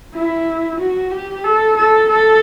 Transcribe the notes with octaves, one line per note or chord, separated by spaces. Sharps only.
E4
F#4
G4
A4
A4
A4